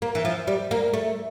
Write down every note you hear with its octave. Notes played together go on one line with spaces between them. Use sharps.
A#3
E3
F3
G3
A#3
A3